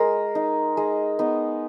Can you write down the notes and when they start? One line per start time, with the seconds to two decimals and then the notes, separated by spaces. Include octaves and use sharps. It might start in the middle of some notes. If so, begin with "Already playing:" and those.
Already playing: G#3 A#4
0.35 D#4
0.77 G#3
1.19 B3 D#4